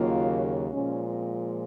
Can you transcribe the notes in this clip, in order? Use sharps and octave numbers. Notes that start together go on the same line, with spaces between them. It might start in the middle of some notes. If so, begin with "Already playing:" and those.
Already playing: D#2 C#3 F#3 A#3 F4
A#2 F3 G#3 C#4
C4